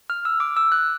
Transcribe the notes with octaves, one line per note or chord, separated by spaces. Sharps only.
F6
E6
D6
E6
F#6